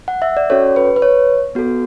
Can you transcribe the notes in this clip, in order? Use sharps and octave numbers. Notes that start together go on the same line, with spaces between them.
F#5
E5
D5
C#4 F#4 A4 C#5
B4
B4
C#5
B3 F#4 A4